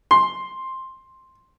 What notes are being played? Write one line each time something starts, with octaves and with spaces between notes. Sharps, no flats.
C6